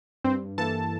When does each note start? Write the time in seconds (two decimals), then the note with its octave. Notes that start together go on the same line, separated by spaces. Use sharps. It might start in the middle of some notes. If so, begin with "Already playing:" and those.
0.24 G2 C4 C5
0.58 E3 A#3 A4 A5